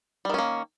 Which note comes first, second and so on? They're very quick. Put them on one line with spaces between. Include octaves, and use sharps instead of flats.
G3 D#3 C#4 A#3